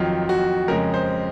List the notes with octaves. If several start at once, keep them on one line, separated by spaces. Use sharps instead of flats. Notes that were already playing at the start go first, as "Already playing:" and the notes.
Already playing: F2 D#3 F#3 F4
F#4
F2 C#3 G#3 A#4
C5